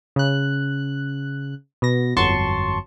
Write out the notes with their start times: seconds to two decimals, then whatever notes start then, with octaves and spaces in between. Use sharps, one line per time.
0.16 C#3 F#6
1.82 B2 A#6
2.16 G1 F2 F#3 A5 C6 C#6